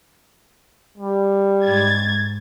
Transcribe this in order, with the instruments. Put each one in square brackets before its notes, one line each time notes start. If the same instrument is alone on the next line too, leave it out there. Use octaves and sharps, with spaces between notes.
[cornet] G3
[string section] G#2 G#6 A6